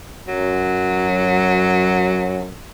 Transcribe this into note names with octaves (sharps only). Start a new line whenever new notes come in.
F#2 F#3